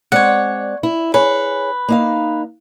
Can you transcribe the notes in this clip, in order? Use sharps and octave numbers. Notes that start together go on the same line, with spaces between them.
G#3 C4 C#5 D5 F#5
E4
G#4 B4 C#5
A#3 D#4 F5